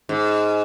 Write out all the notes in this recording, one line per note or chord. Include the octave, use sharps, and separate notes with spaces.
G#2